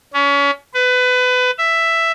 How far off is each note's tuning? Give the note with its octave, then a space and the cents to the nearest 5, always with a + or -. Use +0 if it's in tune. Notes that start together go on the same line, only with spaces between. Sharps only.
C#4 +30
B4 +25
E5 +5